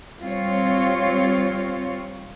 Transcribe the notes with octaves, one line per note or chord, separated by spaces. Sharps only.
G3 C4 F4 C#5